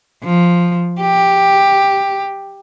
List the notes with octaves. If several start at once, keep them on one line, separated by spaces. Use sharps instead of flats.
F3
G4